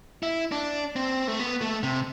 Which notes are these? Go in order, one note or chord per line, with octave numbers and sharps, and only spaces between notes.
E4
D4
C4
A3
B3
A3
C3